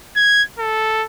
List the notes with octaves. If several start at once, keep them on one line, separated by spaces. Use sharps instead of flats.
G#6
A4